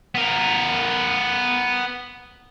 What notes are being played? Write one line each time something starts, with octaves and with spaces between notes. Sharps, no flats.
B3 A#4